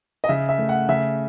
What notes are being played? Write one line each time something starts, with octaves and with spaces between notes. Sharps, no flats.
D#5
C#3 E5
E5
A3
F#5
C#3 E5